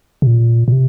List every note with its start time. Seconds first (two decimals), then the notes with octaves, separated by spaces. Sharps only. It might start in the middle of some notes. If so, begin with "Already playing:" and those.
0.22 C3
0.27 A#2
0.68 A#2
0.72 C3